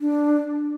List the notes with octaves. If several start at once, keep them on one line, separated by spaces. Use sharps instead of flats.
D4